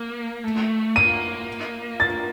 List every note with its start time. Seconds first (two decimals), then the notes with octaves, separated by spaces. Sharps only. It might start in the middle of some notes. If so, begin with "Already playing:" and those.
Already playing: A#3
0.44 A3
0.96 A#3 D#7
2.00 A6